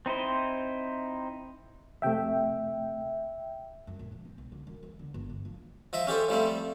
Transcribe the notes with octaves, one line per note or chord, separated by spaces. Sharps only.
C4 D#4 E4 C5
F2 C3 A3 E5 G5
F#2
A#1
F3
C4
B1
D3
F#2
E3
D3
G1
D2
F3
F3 D#5 E5
C#4 G4 A4 C5
F3 G3 A3 C4